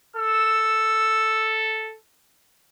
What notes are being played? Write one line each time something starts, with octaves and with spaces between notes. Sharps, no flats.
A4 E6